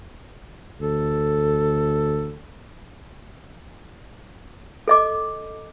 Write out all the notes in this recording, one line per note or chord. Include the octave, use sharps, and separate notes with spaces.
D2 A4
A4 D#5 D6